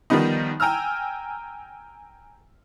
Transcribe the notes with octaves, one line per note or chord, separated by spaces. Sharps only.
D#3 F3 G3 B3 D#4
G5 G#5 A#5 E6 F6